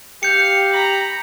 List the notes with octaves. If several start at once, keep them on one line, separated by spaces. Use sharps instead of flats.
G4 F5 G6 C#7
A#5 B5